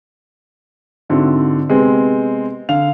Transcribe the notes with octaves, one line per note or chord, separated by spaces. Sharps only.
G#2 D3 C4 D4 E4 F#4
C3 G#3 B3 C4
D3 F5 F7